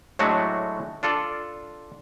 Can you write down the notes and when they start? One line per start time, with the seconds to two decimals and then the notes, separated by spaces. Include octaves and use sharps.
0.19 A2 F#3 G#3 A3 D4 F#4
1.03 D4 F4 A4 D5